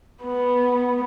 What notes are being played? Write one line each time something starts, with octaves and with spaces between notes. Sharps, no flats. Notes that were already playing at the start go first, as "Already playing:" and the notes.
B3